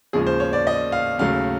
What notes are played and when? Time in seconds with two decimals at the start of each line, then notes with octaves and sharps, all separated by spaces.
0.13 D#2 C#3 F3 G#3 G#4
0.27 C5
0.40 C#5
0.53 D5
0.67 D#5
0.92 F5
1.18 D#2 C#3 F#3 A3 F5